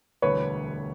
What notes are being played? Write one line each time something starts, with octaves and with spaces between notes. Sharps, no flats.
E1 D2 D3 G3 B4 C#5